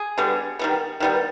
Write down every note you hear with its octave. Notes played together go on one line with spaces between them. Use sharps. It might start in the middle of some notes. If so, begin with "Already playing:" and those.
Already playing: G#4
D3 G3 B3
D#3 G3 B3
D#3 G3 B3